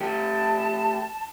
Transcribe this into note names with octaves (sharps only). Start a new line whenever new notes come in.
A3 G4 A5